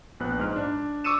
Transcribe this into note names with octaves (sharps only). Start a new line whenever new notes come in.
A#1 B3 F#6
G#2 F6
D4
C#6 D6 E6 C#7 D#7 E7